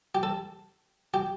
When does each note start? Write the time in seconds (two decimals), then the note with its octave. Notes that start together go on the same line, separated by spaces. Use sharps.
0.15 G4
0.23 A4
1.14 G4